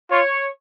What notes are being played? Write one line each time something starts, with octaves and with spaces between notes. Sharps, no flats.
F4 C#5